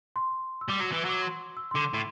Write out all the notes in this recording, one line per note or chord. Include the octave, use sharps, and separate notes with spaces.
C6
E6
G3 D6
F#3 D6
E3 E6
F#3 D6
C6
E6
C6
D3 D6
A2 D6